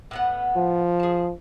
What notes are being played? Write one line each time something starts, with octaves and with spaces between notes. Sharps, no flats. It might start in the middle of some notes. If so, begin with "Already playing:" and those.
A2 B3 F#5
F3
G#4 A5